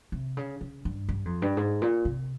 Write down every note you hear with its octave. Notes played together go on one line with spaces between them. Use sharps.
C3
C#3
C#3
G2
G2
F2
G2
G#2
A#2
C3